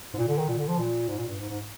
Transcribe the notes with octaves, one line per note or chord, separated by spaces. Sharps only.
G#2
A#2
D3
D#3
A#2
D3
F3
A#2
G#2
A#2
G2
G#2
G#2